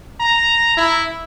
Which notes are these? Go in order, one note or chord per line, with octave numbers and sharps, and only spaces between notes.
A#5
E4